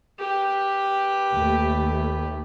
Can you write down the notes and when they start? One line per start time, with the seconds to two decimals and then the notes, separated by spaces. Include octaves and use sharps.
0.19 G4 B4
1.33 D#2 A3